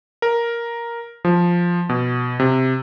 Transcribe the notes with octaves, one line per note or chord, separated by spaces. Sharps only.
A#4
F3
B2
C3